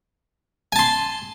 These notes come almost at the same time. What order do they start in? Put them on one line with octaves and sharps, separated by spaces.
G#5 A5 C6